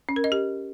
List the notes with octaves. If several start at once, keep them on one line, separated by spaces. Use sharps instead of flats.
C#4
A#4
D#5
G4